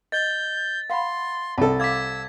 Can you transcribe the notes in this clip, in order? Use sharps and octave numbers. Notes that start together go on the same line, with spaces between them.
D#5 G6 A6
F5 F#5 B5 C6
C2 A4 F#5 A5
F5 D6 E6 G#6 B6